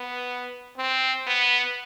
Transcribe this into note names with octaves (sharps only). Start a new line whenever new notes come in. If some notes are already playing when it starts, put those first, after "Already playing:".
Already playing: B3
C4
B3